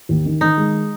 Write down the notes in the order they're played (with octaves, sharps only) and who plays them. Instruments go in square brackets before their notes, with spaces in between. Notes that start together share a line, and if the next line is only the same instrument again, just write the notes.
[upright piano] D#2
D#3
[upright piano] D#3 [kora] D#4
[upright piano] G#3